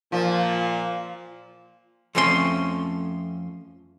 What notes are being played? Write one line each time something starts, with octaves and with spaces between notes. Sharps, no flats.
A#2 F3
F2 F3 A3 C#4 F4 C6